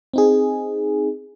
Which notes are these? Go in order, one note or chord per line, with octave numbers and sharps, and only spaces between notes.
C4 D#4 G#4